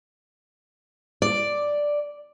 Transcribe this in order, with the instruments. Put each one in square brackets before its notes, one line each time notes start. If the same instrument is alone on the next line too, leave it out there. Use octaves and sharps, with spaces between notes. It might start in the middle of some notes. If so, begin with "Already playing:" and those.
[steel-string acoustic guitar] D5